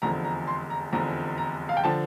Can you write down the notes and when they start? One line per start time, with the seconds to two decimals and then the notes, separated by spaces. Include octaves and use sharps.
0.02 F1 E2 D3 F3 A#5
0.24 A#5
0.47 C6
0.70 A#5
0.93 F1 E2 D3 F3 A#5
1.38 A#5
1.69 F5
1.77 G5
1.84 D3 F3 A5